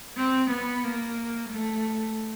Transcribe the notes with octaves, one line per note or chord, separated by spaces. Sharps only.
C4
B3
A#3
A3